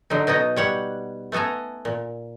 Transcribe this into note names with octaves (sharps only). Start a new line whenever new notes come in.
D3 F#3 D#4
B2 D#4 F#4 D#5
G3 C#5 F#5
A3 B3 A4 G#5 A#5
A#2